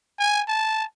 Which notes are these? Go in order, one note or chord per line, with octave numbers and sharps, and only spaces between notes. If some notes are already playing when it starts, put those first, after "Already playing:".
G#5
A5